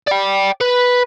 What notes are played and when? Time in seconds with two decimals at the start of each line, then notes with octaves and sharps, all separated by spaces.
0.07 D5 G5
0.61 B4